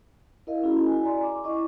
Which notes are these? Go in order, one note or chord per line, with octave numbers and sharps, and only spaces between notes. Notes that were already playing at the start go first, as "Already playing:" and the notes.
E4 A#4 D#5 F5
C#4 E4 F#4 G#4
E4 G#5
D5 G#5 A#5 C6
D6
E4 D#5 C#6 D6